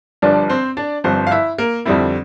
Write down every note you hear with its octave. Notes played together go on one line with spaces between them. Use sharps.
G1 G2 F3 D4 D5
C4 C5
D4 D5
G1 G2 F3 C4 C5
F5
E4 E5
A#3 A#4
F2 D3 G3 C4 E4